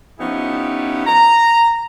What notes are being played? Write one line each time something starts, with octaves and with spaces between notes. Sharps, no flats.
F3 B3 C#4 D#4 E4 G4
A#5